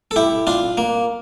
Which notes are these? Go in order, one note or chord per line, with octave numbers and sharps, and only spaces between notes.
A4
E4 G4
D4 F4
A#3